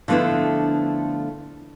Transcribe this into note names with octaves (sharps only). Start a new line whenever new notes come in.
D3 F3 A3 B3 D4 E4